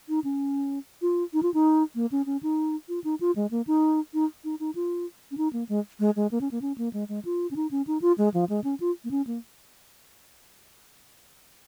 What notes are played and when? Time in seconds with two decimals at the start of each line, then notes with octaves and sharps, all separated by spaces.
0.09 D#4
0.24 C#4
1.02 F4
1.33 D#4
1.43 F4
1.54 D#4
1.95 A#3
2.12 C#4
2.26 C#4
2.43 D#4
2.89 F4
3.04 D#4
3.20 F4
3.36 G#3
3.51 A#3
3.67 D#4
4.14 D#4
4.44 D#4
4.60 D#4
4.75 F4
5.31 C#4
5.37 D#4
5.53 A#3
5.69 G#3
6.00 G#3
6.16 G#3
6.31 A#3
6.41 C#4
6.51 A#3
6.62 C#4
6.78 A#3
6.93 G#3
7.09 G#3
7.25 F4
7.51 C#4
7.56 D#4
7.71 C#4
7.87 D#4
8.02 F4
8.18 G#3
8.34 F3
8.49 G#3
8.64 C#4
8.80 F4
9.04 A#3
9.11 C#4
9.27 A#3